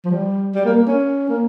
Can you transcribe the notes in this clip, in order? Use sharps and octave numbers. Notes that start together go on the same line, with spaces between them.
F3
G3
G3
A#3
A#3
C#4
A#3